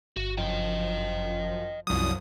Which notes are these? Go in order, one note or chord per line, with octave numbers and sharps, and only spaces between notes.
G1 F#4
F#2 F3 D#5 G5
C2 F#2 F3 F#3 D#6